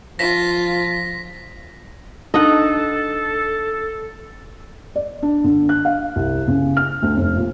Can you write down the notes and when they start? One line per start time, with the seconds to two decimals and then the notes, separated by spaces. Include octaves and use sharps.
0.19 F3 F4 A#6 B6
2.34 D4 D#4 A4 D#5 F#5 A5
4.96 D5
5.22 D4
5.44 D3
5.69 F#6
5.85 F5
6.16 C2
6.48 C#3
6.77 F6
7.02 D2
7.17 F1
7.37 A#2